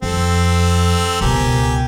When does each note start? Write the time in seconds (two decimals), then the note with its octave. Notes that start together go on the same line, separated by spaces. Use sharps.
0.02 F2 C4 A4
1.21 C#2 B2 G4 A#4 G#5